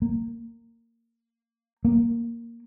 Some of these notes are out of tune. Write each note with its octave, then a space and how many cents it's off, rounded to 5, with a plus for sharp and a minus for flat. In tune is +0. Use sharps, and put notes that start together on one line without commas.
A#3 -15
A#3 +0